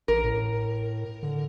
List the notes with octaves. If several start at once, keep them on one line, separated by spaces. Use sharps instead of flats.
A1 A#4
A2
D3